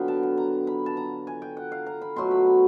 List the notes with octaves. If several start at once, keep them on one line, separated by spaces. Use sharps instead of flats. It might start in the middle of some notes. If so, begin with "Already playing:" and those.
Already playing: D3 F#3 B3 F5 G5
A5
A5
A#5
B5
A5
A#5
G#5
G5
F#5
F5
A#5
B5
B2 F#3 A3 C6
B5
B5